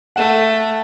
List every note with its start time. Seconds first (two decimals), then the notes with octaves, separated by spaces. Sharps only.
0.16 A3 F#5